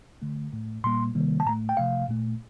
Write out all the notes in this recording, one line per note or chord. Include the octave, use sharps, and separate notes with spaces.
D3 A3
A2 A3
A#2 G3 A#3 C6
C3 D#3 G3 A#3
A5
A2 A3 A#5
G5
C3 F3 A3 F5
A#2 A3